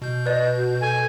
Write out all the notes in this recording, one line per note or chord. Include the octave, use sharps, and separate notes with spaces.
B2 G6
B4 D5 D#5
F#4
A4 G#5